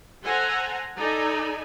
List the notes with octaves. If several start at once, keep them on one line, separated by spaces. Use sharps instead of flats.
A4 C5 F#5 G#5 A#5
D#4 A4 D5 G#5 B5